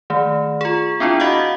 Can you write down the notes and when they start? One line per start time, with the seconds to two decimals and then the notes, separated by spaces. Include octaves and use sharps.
0.10 D#3 A3
0.61 F4 G#4
1.00 B3 C4 D4 E4 F4
1.20 F#4 D#5 F5 F#5